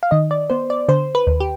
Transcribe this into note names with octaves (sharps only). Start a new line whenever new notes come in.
F5
D#3 D#5
D5
B3 C5
D5
D3 C5
B4
D#2
G4